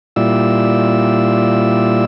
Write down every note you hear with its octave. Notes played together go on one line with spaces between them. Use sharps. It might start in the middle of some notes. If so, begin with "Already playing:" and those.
A#2 G3 E4 F4 D5 E6